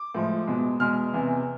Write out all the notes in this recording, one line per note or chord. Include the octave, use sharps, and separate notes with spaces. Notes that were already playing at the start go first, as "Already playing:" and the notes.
Already playing: D6
A2 F3 G#3
E2 B2 G#3
E2 B2 G#3 F6
E2 C3 E3